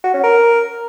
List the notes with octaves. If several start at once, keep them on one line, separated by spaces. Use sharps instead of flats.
F#4
C#4
A#4